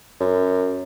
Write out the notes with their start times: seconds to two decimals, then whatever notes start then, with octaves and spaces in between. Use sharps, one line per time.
0.21 F#2